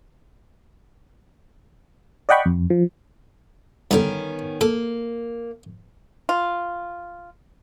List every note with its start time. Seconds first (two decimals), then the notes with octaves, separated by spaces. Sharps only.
2.29 D5 D#5 F#5 G5 B5 C#6
2.46 F2
2.70 F3
3.91 G2 D3 D#3 B3 C#4
4.61 A#3 A4
6.29 F4